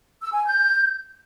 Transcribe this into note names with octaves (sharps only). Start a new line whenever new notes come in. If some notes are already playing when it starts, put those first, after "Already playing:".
E6
G#5
G6